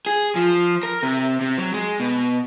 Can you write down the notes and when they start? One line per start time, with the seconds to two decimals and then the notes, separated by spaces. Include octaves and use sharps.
0.06 G#4
0.36 F3
0.83 A#4
1.03 C3
1.41 C3
1.58 F#3
1.73 G#3
2.00 B2